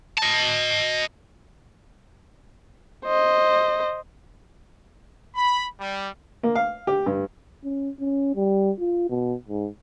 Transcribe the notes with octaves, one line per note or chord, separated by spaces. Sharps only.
D#5 A5
C5 D#5
B5
G3
A#3
F5
G4
G2
C#4
C#4
G3
F4
B2
G#2